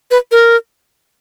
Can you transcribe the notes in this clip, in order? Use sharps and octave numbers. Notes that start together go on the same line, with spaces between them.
B4
A#4